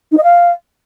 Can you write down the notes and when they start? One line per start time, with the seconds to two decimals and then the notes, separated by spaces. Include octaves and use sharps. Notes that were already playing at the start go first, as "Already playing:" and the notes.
0.11 D#4
0.17 D#5
0.23 F5